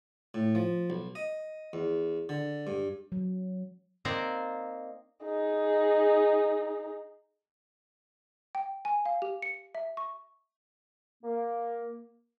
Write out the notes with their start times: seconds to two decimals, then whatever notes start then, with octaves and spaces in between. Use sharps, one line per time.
0.34 A2
0.55 F3
0.90 B1
1.15 D#5
1.73 E2
2.29 D3
2.67 G2
3.12 F#3
4.05 A#3 C4 D#4 C5 D5
5.25 D#4 G#4
8.55 G5
8.85 G#5
9.06 F5
9.22 G4
9.42 C#7
9.75 E5
9.97 C#6
11.24 A#3